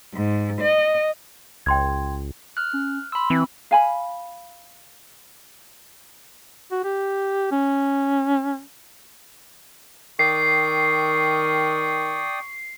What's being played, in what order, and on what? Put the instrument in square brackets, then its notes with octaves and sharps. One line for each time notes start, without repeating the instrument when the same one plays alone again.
[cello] G#2
D#5
[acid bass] C#2 [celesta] G5 C6 G#6
[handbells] F6 F#6
[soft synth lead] C#4
[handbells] B5 E6 [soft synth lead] C6
[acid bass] E3 [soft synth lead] C4
[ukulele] F5 G#5 B5
[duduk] F#4
G4
C#4
[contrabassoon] D#3 [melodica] D5 G5 D#6 [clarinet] C#6 [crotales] C7